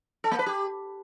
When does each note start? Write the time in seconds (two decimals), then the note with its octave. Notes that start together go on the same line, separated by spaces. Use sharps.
0.24 A4
0.31 A#3
0.39 B4
0.46 G4